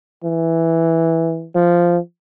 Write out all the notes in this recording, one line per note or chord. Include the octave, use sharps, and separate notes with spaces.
E3
F3